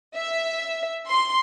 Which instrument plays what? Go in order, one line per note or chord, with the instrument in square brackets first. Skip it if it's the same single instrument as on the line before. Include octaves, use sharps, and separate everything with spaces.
[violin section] E5
C6